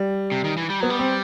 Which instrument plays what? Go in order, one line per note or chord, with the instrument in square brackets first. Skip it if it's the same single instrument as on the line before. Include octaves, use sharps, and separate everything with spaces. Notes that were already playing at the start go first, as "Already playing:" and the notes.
Already playing: [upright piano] G3
[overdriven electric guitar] C3
D#3
E3
G3
[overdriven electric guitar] F#3 [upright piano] B3
[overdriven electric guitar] G3
[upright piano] C4